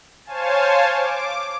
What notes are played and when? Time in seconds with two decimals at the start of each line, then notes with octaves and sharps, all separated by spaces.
0.25 C5 C#5 F5 G#5 A5
0.93 D6